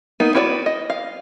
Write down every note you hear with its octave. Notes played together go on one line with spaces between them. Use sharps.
A#3 B3 D#4
E4 F#4 B4 C#5 D5
D#5
F5